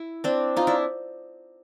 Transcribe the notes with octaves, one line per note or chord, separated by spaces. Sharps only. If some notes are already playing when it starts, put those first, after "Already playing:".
Already playing: E4
C4 D4
D#4 F4
D4 E4